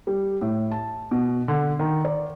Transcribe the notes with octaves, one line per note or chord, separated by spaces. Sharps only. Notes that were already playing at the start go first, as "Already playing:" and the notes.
G3
A2
A5
B2
D3
D#3
D5